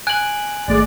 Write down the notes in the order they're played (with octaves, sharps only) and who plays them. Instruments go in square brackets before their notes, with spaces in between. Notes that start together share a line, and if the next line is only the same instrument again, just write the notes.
[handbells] G#5 G#6 D7 [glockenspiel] F#6 F#7
[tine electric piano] G#1 A3 [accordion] G#3 D5